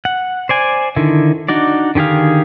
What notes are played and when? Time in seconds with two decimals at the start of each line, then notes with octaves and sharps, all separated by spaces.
0.05 F#5
0.49 C5 D5 G#5
0.96 D3 D#3 E4
1.49 D4 D#4 F#4 D5
1.95 D3 D#3 G4 G#4 F5